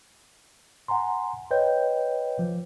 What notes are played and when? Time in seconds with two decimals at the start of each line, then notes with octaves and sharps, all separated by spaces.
0.88 F#5 G#5 A#5 C6
1.51 B4 C#5 D#5 G5 G6
2.39 F3